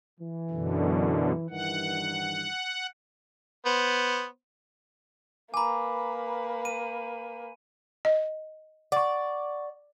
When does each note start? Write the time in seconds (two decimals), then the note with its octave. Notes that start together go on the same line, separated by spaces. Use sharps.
0.20 E3
0.50 F#2 B2 D3
1.50 G2 D#3 E3 F#5
3.66 B3 C5
5.54 A#3 B4 G#5 A#5 B5 D6
6.65 D#7
8.05 D#5
8.92 D5 F#5 C#6